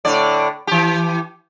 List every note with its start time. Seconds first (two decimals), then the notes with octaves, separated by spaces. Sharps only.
0.05 A2 D3 D5
0.67 E3 G4